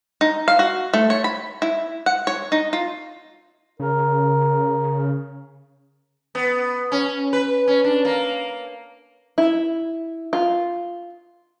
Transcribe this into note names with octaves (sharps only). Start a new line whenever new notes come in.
D#4
F5
F#4
A3
C#5
B5
E4
F#5
C#5
D#4
F4
C#3 A#4
B3
C#4
B4
C#4
D4
A#3
E4
F4